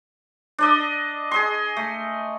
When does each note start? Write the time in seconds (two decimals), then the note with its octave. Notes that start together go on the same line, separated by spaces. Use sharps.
0.59 D4 D5 D#5
1.31 G#4 D#5 C6
1.77 A3